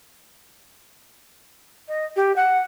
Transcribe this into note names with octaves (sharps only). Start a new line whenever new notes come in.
D#5
G4
F#5